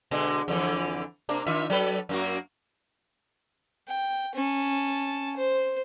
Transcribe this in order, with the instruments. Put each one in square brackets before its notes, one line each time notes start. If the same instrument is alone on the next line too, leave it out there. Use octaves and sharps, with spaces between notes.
[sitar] B2 D3 G#3
F2 D3 E3
C3 A#3 D4
D#3 F4 E5
F#3 A4 B4
F#2 A#3 F#4
[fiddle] G5
C#4 A5
C5